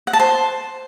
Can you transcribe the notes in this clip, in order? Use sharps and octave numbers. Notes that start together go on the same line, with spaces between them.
F#5
A5
C5